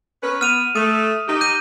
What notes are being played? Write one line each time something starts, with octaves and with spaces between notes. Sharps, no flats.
C#4 A#4 B4
B3 F6 D#7 F7
A3 D#6
D#4 G4
G6 D#7